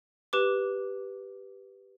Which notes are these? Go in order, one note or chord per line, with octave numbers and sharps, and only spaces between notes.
G4 B4 D6